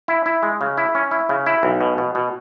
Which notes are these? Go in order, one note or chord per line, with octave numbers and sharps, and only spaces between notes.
E4
E4
G#3
C#3
E4
C#4
E4
C#3
E4
B1
B2
B2
B2